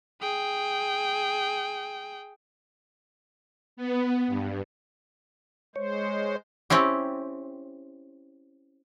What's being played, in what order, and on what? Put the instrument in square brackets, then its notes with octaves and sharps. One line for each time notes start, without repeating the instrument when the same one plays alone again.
[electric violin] G#4 G5
[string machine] B3
G2
[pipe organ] G#3 C5 [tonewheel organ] C#5
[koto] C4 C#4 E4 G4